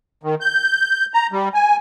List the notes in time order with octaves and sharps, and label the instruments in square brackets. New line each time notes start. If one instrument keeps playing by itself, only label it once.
[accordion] D#3
G6
A#5
G3
G#5